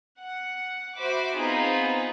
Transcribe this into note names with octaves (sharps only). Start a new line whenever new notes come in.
F#5
F#4 C5 E5 B5 D6
B3 C4 D#4 F4 G#4 B5